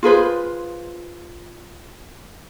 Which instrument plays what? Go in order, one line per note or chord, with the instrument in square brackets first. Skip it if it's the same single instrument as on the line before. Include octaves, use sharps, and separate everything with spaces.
[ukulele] F4 G#4 B4 C5